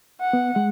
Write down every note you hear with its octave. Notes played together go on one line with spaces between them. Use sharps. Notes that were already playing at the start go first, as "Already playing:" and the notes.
F#5
B3
G#3